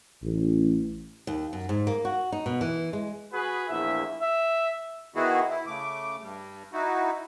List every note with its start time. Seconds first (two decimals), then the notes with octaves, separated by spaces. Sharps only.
0.23 A1
1.27 D#2
1.53 F#2
1.69 G#2
1.87 A#3
2.05 F#4
2.32 D#4
2.46 B2
2.61 E3
2.93 G#3
3.33 F#4 G#4 B4
3.69 A#1 E2 E4 E5
4.21 E5
5.16 D#3 G#3 B3 E4 F#4 G#4
5.48 E4
5.67 C#3 A3 D6
6.22 G2 G3
6.73 D#4 E4 F#4